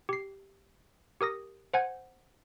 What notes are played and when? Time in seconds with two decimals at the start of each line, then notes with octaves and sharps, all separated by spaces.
0.09 G4 C7
1.21 G4 A#4 D#6 A#6
1.74 C5 F#5 G#5 G#6